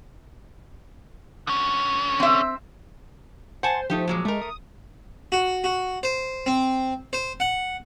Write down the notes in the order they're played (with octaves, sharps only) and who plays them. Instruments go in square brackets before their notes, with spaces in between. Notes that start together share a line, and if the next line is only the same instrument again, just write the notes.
[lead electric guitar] D3 C#4
[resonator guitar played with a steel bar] C4 E5
[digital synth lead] C5 [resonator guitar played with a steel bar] F#5 G#5 A5
[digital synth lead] F3 [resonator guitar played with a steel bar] A3 D#4 G4
[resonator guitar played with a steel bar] A#2 F#3 G#3
[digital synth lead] G#3 [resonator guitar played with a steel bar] A3 A#4
[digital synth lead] D#6
[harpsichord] F#4
F#4
C5
C4
C5
F#5